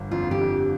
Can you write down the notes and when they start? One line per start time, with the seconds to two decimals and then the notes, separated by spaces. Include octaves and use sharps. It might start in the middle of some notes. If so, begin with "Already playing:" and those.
Already playing: G1 D3
0.11 F2 F4
0.31 G4
0.41 F2